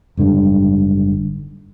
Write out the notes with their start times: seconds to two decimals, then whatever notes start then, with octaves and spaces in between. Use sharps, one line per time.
0.17 F#1 G#2 D3 G3